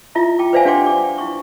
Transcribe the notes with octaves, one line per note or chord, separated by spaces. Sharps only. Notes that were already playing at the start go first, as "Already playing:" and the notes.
E4 F4 E5 A#5
G5 A5 D6
B4 C5 D5 E5 F5 G#5
D4 G4 F#5 G5 C6 D6
D6
E4 C#6